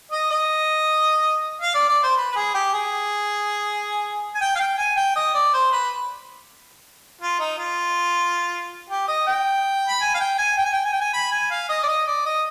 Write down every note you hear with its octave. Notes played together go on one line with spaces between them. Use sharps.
D#5
D#5
F5
D5
D5
C5
B4
B4
G#4
G4
G#4
G#5
G5
F5
G5
G#5
G5
D#5
D5
C5
B4
F4
D#4
F4
G4
D#5
G5
B5
G#5
F5
G5
G#5
G5
G#5
G5
G#5
G5
G#5
B5
G#5
F5
D#5
D5
D#5
D5
D#5